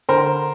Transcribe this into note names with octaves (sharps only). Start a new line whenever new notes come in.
D3 A#4 C5